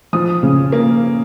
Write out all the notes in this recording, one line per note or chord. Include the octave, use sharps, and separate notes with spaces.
F3 D#6
C#3
A#3